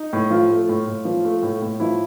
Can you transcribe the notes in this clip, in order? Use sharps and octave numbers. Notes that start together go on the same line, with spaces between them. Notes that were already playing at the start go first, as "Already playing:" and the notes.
Already playing: D#4
A2
F3 F4
A3
A2
A2
F3
A3
A2
A2
F3 E4